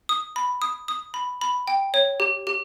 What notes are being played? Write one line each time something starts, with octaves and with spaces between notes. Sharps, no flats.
D#6
B5
D#6
D#6
B5
B5
G5
C#5
G4
G4